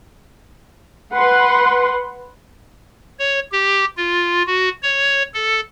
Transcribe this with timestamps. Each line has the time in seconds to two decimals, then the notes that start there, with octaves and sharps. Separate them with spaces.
1.13 B4 F#5 C6
3.19 C#5
3.52 G4
3.97 F4
4.47 F#4
4.82 C#5
5.34 A4